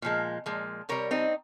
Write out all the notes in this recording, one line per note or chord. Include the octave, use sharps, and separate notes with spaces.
A#2 F3 G#3
A#2 F3 G#3
C3 G3 A#4 C#5
C4 D#4